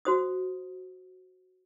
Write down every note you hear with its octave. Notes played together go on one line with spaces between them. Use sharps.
F#4 C5 D#6